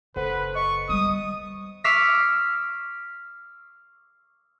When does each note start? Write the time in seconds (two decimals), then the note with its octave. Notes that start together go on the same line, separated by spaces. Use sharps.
0.16 F#1 A4 B4 C5 F#5
0.55 D#5 C#6
0.89 G3 B3 D#6
1.84 C#6 D6 E6 F6 B6 C7